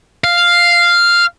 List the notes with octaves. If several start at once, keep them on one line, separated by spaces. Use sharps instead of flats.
F5